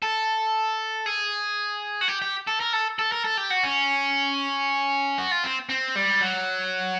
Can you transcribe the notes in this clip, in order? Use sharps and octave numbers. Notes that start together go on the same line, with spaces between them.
A4
G#4
F#4
G4
G4
A4
A#4
A4
A4
A#4
A4
G4
F#4
C#4
F#4
F4
C4
C4
G3
F#3